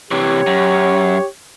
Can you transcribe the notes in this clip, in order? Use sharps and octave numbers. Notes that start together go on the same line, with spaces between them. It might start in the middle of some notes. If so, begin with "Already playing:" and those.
C3 E3 G4 C#5
F#2